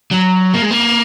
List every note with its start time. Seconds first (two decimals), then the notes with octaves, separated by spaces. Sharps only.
0.11 F#3
0.54 A#3
0.62 G#3
0.71 A#3